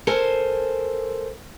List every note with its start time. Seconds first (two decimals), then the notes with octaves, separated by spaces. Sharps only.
0.07 A4 A#4 C5 G#5